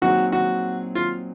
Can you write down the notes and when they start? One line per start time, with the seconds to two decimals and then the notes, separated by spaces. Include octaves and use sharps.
0.02 A#2 F#3 C4 D#4 F#4 G#4
0.32 F#4
0.95 F4